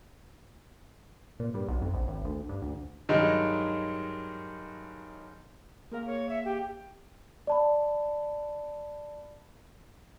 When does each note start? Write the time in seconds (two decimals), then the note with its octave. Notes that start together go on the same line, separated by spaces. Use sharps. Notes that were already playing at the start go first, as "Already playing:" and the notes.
1.40 A#2
1.54 G2
1.68 B1
1.82 F2
1.93 A#1
2.07 G#1
2.25 D2
2.49 G2
2.62 D2
3.09 G2 D#3 F#3 G#3 D#4
5.91 A#3 G#4 A#4 F5
6.06 C#5
6.29 E5
6.45 G4
7.47 D5 A5 B5